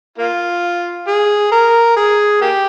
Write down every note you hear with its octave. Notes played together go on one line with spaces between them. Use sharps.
A#3 F4
G#4
A#4
G#4
A#3 G4